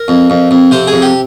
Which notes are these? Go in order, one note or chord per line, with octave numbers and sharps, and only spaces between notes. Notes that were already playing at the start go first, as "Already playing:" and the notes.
Already playing: A#4
F2
F2
F2
C3 C5
G#4
F2
G4